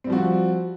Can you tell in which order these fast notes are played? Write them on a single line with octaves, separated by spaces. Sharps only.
C4 G3 F3 F#4